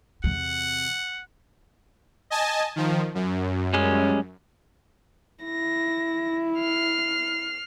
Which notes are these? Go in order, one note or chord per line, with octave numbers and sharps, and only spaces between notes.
E2 C3 F#5
D#5 G#5 A5
D#3 F3
F#2
G3 G#3 C#4
E4 A#6
F6 C7